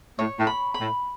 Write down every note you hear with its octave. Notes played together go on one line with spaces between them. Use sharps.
A2 C#5
A2
B5
B5
A2